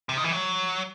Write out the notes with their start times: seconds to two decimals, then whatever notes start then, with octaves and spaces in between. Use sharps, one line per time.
0.09 C3
0.17 D#3
0.24 E3
0.32 F#3